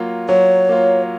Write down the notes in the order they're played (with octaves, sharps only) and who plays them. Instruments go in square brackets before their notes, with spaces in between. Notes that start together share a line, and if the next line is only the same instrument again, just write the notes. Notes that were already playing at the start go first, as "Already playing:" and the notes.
Already playing: [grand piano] F#3 A#3 F4
[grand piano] F#3 [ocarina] C#5
[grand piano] A#3 F4